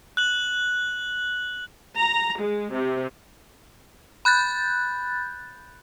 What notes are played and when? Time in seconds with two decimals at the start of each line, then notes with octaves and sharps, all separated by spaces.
0.17 F#6 F#7
1.94 A#5
2.40 G#3
2.73 C3
4.25 B5 F#6 G6 A6